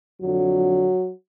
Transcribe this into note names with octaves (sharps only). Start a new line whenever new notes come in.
F2 D3 F#3